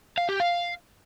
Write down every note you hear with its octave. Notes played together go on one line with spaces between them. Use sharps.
F5
G4
F5